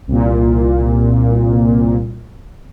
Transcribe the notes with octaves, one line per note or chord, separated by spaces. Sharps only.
C2 A#2